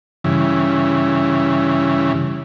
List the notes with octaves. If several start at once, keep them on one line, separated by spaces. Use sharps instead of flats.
G2 C#3 E3